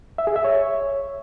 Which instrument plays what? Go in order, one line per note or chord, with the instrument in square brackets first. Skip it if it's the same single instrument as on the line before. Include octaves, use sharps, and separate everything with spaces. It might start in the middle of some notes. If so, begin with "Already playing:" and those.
[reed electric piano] E5
G#4
E5
C#5